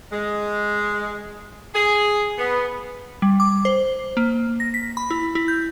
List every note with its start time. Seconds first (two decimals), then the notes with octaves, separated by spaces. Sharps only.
0.12 G#3
1.75 G#4
2.38 B3
3.22 G3
3.40 D6
3.65 C5
4.17 A#3
4.60 A#6
4.74 B6
4.97 B5
5.10 E4
5.35 E4
5.48 G6